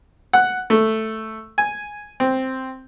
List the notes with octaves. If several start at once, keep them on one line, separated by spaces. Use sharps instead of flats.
F#5
A3
G#5
C4